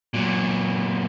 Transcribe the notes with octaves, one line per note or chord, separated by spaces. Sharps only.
A#2 F#3